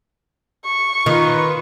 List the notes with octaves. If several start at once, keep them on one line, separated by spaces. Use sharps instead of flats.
C#6
D#3 F4 B4